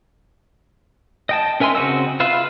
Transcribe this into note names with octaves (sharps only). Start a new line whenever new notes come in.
D#5 G5 A5
C#4 A#4 E5 G#5 C6
C#3 C4 F#4 D#5 E6
F4 B4 E5 F5